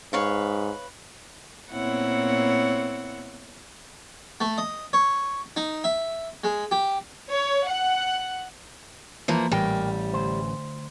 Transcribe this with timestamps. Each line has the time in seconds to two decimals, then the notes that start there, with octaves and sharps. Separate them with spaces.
0.13 G#2 B4 C#5 F5
1.72 A#2 B3 C4 E4 C#5 F#5
4.41 A3
4.58 D#5
4.93 C#5
5.56 D#4
5.84 E5
6.44 G#3
6.71 G4
7.31 C#5
7.67 F#5
9.28 E3 F3 A#3
9.52 A1 A#2 G3 A#4 G5
10.13 D2 C5